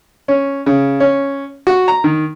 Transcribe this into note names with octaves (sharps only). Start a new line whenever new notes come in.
C#4
C#3
C#4
F#4
A#5
D#3